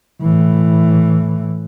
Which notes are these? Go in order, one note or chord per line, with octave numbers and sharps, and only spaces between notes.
A2 E3